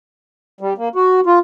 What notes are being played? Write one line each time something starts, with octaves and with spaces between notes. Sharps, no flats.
G3
A#3
F#4
F4